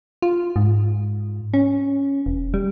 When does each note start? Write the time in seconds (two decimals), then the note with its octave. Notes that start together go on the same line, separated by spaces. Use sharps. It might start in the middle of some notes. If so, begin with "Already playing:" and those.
0.22 F4
0.56 G#2
1.54 C#4
2.26 E1
2.54 G3